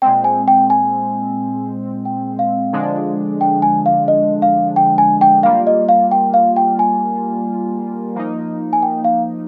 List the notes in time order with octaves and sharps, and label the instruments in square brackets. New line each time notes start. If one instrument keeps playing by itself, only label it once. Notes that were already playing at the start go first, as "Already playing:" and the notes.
[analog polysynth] A#2 G#3 C4 [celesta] G5
[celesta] G#5
G5
G#5
G5
F5
[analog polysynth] D3 F3 G#3 D4
[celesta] G5
G#5
F5
D#5
F5
G5
G#5
G5
[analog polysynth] G3 A#3 F4 [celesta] F5
[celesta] D#5
F5
G5
F5
G5
G#5
[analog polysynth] F3 A#3 D#4
[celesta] G#5
G5
F5